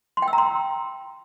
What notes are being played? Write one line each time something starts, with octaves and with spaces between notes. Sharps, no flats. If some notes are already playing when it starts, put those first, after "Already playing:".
C6
G5
E6
A#5
C6